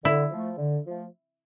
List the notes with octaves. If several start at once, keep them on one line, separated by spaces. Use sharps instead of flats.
D3 E4
F3 A3
D3
F3 A3